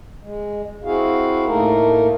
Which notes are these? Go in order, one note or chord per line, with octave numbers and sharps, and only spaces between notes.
G#3
C4 E4 F#4 G#4 F5
A2 A3 A#3 D#4 A#4